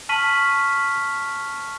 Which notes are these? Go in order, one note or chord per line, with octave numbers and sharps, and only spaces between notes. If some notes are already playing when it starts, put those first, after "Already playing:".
A5 C#6 F6 B6 D#7 F#7